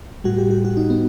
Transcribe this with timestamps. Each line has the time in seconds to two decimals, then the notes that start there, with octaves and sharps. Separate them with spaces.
0.24 A2 G3 F#4
0.38 G4
0.50 G4
0.65 F#4
0.77 D#4
0.90 B3